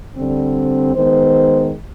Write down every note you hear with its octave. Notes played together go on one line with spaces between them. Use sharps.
D3 G3 C4
D#3 G#3 B3 C5